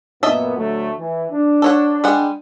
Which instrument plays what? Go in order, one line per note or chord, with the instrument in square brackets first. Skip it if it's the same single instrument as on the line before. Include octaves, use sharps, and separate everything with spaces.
[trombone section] F#2 A#2 B3 [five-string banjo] D#5 E5 A5
[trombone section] D2 F#3 A3
E3
D4
[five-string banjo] A4 C#5 F#5
G3 G#3 F#5